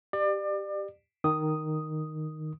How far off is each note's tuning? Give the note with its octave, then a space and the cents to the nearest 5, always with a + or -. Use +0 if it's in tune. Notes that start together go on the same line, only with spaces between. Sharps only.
G4 +0 D5 +30
D#3 -5 D#6 +0